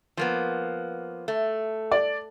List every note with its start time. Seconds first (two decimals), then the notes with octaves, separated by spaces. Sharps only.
0.17 F3 A#3 B3
1.28 A3
1.91 D5